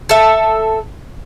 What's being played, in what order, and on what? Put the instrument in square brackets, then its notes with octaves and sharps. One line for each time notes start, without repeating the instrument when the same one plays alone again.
[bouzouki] A4 E5